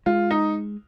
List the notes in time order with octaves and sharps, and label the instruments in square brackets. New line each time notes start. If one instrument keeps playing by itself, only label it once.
[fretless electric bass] G#3 [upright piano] F4
[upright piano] D#4